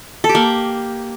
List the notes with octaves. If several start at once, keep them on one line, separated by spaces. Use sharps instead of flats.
A4
G4
A#3